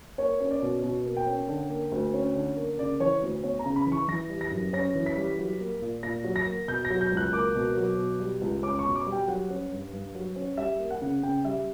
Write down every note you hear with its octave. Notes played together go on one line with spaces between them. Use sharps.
A#3 C#5
C#4
D5
B2
B2
A#3
G5
C#4
D3
A#3
D2
C#4
D3
A#3
C#3 D5
E3 C#5
D2
B3 C#5
A#5
C#3
B5
E3
C#6
E3 A#6
G3
A#6
F#2
C#4 A#6
E3
B6
G3
F#3
A#3
A#2
A#2 A#6
F#3
A#6
A#3
B2 G6
A#6
F#3
G6
C#2
F#6
A#3 D6
B2
F#3
B2
G3
C#2
C#4 D6
C#6
B2
D6
G3
G5
F#3 F#5
C#4
G2
G2
F#3
C#4
G3 E5
A#3
F#5
C#3
C#3 G5
G3 E5